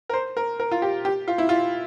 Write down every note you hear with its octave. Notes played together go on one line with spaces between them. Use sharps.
A#4
C5
A#4
A#4
F4
G4
G4
F4
E4
F4